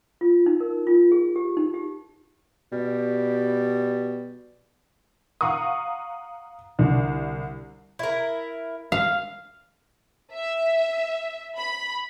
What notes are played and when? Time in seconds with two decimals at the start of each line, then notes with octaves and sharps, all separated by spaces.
0.21 F4
0.46 D#4
0.60 A#4
0.87 F4
1.12 G#4
1.36 G4
1.57 D#4
1.74 G4
2.72 B2 G3
5.41 F5 F#5 A#5 C#6 D#6
6.79 C2 D3
7.99 E4 A#4
8.92 F5
10.33 E5
11.58 B5